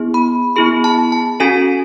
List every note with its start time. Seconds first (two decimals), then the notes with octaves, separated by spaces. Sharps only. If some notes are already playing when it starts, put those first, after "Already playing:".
Already playing: B3 E4 G#4
0.14 B5
0.56 B3 E4 G#4 B5
0.84 A5
1.12 A5
1.40 C#4 F#4 A4 G#5